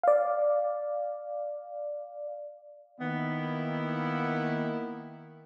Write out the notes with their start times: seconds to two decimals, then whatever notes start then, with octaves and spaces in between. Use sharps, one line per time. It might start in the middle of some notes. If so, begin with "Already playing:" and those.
0.03 D5 F5
3.00 D#3 A#3 B3 E4